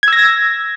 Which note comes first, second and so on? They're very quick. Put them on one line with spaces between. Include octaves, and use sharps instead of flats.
G#6 E6 A#6